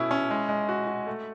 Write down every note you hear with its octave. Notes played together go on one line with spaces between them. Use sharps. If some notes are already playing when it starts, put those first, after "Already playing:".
Already playing: B2 A3 C#4 E4
C#4
G#3
G#3
F#4
F#4
A3